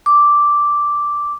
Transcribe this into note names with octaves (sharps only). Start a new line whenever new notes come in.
D6